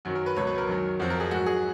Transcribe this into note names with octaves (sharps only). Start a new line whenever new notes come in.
F#2 D#3 F#3 F#4
A#4
B4
C#2 B2 F#3 C#5
B4
A#4
F#2 D#3 F#3
F2 F3 F#4
A#4
G#4
G#2 F#3 F#4
G#4